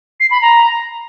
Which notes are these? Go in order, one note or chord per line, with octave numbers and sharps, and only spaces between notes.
C7
B5
A#5